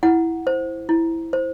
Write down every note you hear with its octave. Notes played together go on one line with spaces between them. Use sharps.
E4 F#5
C5
E4
C5